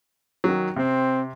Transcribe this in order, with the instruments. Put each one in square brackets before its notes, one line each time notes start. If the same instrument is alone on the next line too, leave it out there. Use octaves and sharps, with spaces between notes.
[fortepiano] D#3 F#3
[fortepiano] C3 [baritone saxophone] C4